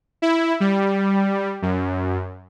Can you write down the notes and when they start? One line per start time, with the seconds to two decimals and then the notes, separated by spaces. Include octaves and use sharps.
0.22 E4
0.60 G3
1.62 F#2